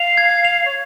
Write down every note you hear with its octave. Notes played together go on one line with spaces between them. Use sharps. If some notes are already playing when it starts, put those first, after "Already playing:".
Already playing: F5 F7
G#6
F7
C#5